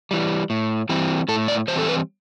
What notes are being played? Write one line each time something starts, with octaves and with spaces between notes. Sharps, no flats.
E3 G3
A2
E3 G3 C4
A2 A4
D5
E3 G3 C4 C5
A4
B4